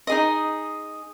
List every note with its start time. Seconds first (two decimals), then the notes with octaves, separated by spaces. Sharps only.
0.07 D#4 G#4 D#5